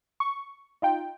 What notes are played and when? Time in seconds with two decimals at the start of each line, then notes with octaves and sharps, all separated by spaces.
0.20 C#6
0.82 D#4 F4 G5